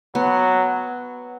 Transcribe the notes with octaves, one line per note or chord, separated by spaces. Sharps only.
F#3 B3